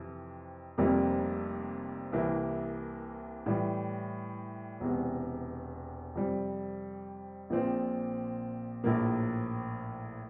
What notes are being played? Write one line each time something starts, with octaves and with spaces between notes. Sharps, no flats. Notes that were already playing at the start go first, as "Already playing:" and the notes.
Already playing: F2 C3 E3
F1 F2 C3 G3 A#3
C2 C3 E3 A#3 E4
A2 E3 G3
E1 E2 C3
F2 C3 G3
A#1 A#2 F3 C4
A#1 A2 F3 A#3